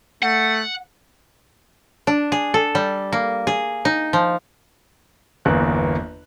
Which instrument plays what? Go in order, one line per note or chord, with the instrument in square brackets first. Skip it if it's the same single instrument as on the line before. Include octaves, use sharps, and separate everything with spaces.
[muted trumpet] A3 [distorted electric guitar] F#5
[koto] D4
G#4
A4
G3
A#3
G#4
D#4
F3
[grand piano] G1 E2 A#3 F#6